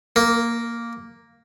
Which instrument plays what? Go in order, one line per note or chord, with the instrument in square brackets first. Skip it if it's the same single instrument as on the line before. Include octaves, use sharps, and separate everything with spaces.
[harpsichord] A#3